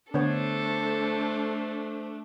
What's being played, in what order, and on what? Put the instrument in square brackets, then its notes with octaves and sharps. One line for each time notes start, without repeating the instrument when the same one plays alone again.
[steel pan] D3 B3 C#5 [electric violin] A3 D4 [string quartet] A4 [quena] C5